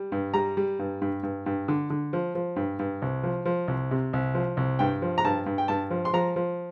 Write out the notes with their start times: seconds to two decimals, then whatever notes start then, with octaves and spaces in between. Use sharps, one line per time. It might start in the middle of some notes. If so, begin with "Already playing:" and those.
Already playing: G3
0.12 G2
0.34 G3 A#5
0.57 G3
0.79 G2
1.02 G2
1.23 G2
1.46 G2
1.68 D3
1.90 D3
2.13 F3
2.35 F3
2.56 G2
2.79 G2
3.02 C2
3.23 F3
3.45 F3
3.68 C2
3.91 C3
4.13 C2
4.35 F3
4.57 C2
4.79 G2 G5
5.02 F3
5.18 A#5
5.24 G2 A5
5.46 G2
5.58 G5
5.68 G2 A5
5.91 F3
6.05 C6
6.13 F3 A#5
6.36 F3